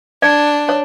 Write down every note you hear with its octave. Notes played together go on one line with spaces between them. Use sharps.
D4 D5
C#5